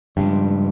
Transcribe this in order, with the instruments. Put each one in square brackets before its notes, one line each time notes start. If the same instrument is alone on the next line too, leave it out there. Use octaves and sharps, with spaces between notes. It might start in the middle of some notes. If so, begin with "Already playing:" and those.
[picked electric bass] G2 [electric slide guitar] C#3 F3 G#3 C4